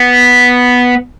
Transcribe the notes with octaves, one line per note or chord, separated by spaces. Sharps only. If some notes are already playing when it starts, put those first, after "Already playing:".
Already playing: B3